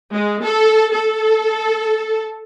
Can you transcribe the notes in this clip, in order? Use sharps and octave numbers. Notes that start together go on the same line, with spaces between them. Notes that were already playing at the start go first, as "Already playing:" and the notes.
G#3
A4
A4